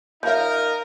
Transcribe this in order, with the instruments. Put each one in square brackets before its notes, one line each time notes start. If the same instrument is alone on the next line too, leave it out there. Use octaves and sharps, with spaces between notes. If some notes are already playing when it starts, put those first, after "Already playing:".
[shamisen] F3 E5 [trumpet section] D#4 A#4 [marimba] C#5 F5 G6